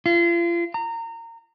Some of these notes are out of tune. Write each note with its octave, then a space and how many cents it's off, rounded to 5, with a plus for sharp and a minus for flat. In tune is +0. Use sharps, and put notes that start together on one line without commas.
F4 -35
A#5 -25